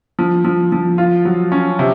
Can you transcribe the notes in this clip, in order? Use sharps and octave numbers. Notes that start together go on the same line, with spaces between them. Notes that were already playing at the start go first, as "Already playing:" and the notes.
F3
F3
F3
F4
F#3
C#4
C3